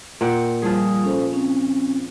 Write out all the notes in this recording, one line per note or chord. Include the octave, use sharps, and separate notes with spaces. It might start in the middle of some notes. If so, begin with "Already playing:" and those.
A#2 F#5 G5
F3 G3 G#4 D#6
C#4 A4 C5
C4 C#4